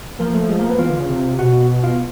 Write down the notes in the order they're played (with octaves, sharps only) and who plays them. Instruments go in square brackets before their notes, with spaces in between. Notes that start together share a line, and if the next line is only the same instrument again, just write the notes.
[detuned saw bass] F3 [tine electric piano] A#3 A#4
[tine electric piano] A3 A4
G#3 G#4
A#3 A#4
B3 B4
[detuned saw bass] E3 [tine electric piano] F4 F5
[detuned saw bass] D3
C#3
C3
[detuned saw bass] B2 [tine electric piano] F#4 F#5
[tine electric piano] F4 F5